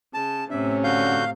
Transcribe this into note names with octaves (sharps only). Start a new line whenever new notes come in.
C#3 A5
A2 C3 C#4 E5
D3 F#4 F5 G6